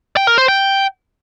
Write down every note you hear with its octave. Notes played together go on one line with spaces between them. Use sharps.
G5
A#4
C5
G5